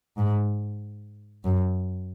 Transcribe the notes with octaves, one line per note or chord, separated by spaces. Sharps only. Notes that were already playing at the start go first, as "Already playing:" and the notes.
G#2
F#2